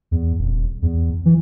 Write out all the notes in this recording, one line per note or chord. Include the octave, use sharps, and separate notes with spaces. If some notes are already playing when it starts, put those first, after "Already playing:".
E2
D#1
E2
E3